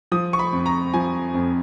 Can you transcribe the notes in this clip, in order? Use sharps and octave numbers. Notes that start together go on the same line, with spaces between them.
F3 D#6
C#6
B5
F2
A#5
F3 G#5
F2